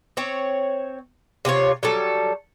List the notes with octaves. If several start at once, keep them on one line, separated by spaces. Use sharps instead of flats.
C4 C#5
C3 F4 A4 C#5
F#3 G3 A4